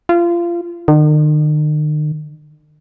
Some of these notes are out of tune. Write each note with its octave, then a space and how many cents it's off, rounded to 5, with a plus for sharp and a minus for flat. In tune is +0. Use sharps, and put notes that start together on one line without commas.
F4 -25
D#3 -45